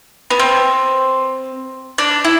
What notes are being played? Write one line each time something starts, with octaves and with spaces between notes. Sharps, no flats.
B3
C4
D4
E4